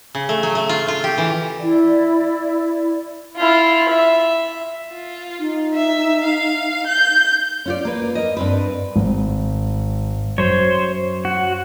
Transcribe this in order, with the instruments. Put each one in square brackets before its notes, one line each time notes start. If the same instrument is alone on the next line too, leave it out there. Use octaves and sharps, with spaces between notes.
[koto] C#3
A3
F#3
A3
F4
F4
G4
E3
[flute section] E4 D5
[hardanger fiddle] E4 F4
E5
[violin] F4
[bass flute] D#4
[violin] E5
F5
G6
[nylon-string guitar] C#4 F4 D5
A#3 B4
A#4 D#5
G2 C4 B4
[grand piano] G#1
[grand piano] F#2 [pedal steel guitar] C5 C#5
[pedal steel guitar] F#4